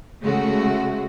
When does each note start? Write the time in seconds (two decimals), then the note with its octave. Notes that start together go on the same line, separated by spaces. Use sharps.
0.21 C#3 G#3 A3 F#4